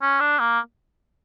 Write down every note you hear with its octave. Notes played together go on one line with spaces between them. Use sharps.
C#4
D4
A#3